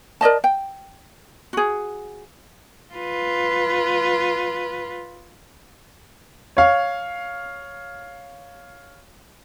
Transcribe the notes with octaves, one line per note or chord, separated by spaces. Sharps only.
A#4 D5 D#5 A5
G5
F#4 G#4
F4 B4
C#5 F5